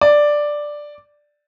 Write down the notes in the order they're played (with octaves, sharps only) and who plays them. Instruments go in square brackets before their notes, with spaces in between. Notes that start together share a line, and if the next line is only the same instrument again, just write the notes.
[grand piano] D5